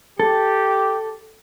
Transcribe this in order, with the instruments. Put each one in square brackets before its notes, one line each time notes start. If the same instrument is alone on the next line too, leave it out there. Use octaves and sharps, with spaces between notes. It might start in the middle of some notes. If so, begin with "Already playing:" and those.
[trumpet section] G4 [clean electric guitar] A4